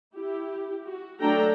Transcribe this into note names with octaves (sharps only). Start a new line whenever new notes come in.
E4 G4
F#4
F#3 A3 D4 A4 G5 A#5